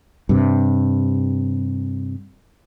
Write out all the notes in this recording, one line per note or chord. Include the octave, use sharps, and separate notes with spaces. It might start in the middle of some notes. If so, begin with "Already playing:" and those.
G2 C3